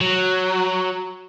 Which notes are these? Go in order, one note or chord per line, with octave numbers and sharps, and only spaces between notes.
F#3